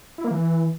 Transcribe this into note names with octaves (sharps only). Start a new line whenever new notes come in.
E4
A#3
E3